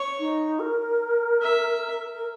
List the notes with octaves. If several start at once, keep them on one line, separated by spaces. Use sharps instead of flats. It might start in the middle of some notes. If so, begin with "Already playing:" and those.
Already playing: C#5
D#4
A#4
E5
A#4